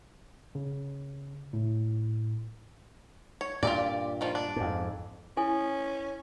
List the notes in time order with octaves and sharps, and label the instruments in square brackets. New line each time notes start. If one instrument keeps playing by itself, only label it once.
[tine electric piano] C#3
A2
[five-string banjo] C#5
[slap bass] G2 A#2 [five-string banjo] F4 G4 D5
[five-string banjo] D#3 F3 F4
D4
[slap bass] F2 G#2
[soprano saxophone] C#4 [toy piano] E4 A4 G#5